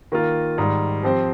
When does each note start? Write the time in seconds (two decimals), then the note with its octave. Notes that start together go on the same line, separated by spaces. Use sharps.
0.12 D#3 A#3 F4
0.58 G#2 D#3 G3
1.03 F3 C4 G4 C5